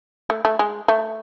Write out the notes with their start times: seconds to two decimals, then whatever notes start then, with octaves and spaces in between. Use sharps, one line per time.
0.30 A3
0.45 A3
0.59 G#3
0.88 A3